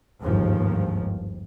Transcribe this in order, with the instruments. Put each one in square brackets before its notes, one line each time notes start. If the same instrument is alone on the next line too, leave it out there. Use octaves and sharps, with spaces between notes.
[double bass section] G1 D#2 G#2 F3